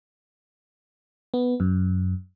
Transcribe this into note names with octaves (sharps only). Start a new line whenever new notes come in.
B3
F#2